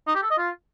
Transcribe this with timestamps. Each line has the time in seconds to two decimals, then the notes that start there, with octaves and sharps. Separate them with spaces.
0.07 D#4
0.15 G4
0.23 A4
0.30 D#5
0.38 F4